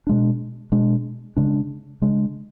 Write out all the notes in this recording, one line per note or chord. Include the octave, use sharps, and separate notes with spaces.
B2 G#3 D4
B2 G#3 D4
C#3 G#3 D4
C#3 G#3 D4